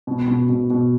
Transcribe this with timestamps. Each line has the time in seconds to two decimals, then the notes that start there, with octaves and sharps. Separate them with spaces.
0.07 B2
0.27 B2
0.49 B2
0.70 B2